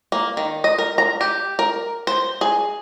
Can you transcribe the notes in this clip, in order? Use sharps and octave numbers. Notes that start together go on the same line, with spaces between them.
A#3
D#3
D#5
A#4
A#5
G4
A#4
C5
G#4